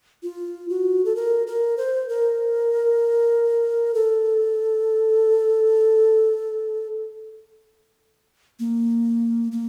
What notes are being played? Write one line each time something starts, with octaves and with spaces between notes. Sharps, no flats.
F4
F#4
A4
A#4
A#4
C5
A#4
A4
A#3
A#3